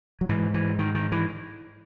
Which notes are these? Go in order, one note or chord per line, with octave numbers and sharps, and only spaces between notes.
F#3
G#2 E3
E3
D#3
D#3
E3